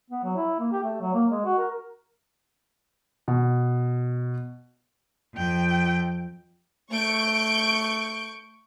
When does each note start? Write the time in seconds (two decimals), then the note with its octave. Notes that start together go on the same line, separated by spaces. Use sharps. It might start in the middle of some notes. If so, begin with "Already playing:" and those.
0.10 B3
0.24 F#3
0.36 E4
0.60 A#3
0.72 G4
0.83 A3
1.01 F#3
1.14 A#3
1.30 G#3
1.45 F#4
1.58 A#4
3.28 B2
5.34 F2 G5
6.92 A3 C#6 G6 D7